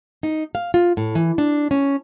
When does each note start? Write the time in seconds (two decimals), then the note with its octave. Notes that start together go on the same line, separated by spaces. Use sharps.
0.23 D#4
0.55 F5
0.74 F4
0.97 A2
1.15 E3
1.38 D4
1.71 C#4